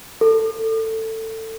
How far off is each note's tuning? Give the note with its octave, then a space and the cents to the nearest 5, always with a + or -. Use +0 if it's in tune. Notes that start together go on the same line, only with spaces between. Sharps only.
A4 +20